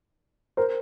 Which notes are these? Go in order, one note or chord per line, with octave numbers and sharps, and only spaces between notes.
A#4 C5